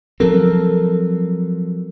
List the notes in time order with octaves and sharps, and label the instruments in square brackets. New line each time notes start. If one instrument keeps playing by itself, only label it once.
[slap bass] F3 F#3 C4 [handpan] A4 A#4